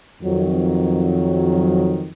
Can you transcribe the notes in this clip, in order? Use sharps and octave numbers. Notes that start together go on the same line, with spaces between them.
F2 D#3 F#3